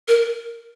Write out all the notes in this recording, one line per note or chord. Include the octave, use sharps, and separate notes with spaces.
A#4